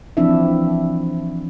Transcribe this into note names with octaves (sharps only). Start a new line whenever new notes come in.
E3 F3 C4 D4 E4 E5